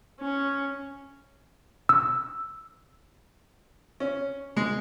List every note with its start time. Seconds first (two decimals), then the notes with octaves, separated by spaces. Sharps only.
0.21 C#4
1.89 E6
4.00 C#4
4.57 G#3